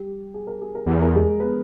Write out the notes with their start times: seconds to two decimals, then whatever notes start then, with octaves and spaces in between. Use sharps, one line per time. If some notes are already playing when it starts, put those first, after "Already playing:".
Already playing: G3 G4
0.34 G#4
0.47 A#4
0.61 G#4
0.75 A#4
0.86 E2 G#4
1.02 A#4
1.15 G#3 G#4
1.40 B3 B4